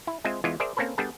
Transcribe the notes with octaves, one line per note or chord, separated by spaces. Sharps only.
E4
G#3 C4 F4 C5 E5 G#5
E2 E3 G#3 F4
G#4 A#4 C5 D5 E5
A#3 C4 C#4 A4 B4
G3 B3 D4 G#4 A4